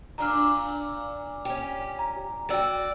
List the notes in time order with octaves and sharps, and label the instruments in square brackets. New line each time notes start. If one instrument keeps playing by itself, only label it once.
[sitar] A#2 D4 [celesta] A#5 F6
[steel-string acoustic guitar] C#4 G4
[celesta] A#5
[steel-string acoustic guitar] F#4 G5 [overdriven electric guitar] D5 [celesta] E6